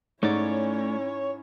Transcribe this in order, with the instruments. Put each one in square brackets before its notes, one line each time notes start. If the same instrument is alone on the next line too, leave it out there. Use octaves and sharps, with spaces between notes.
[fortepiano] G#2 [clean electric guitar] A3 D5 [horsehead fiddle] C#4 E4 [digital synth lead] C#5